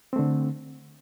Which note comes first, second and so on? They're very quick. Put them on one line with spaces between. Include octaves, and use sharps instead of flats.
C4 A3 D3